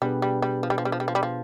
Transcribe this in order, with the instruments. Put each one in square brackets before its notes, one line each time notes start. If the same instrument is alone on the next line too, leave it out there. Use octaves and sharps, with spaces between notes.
[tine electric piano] B2 B3 D4 G#4 B4 [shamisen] G3
[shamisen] G3
G3
F3
G3
F3
G3
F3
G3
F3
G3
F3